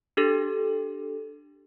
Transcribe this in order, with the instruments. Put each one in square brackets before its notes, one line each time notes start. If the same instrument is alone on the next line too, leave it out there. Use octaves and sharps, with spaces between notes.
[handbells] D4 G4 A4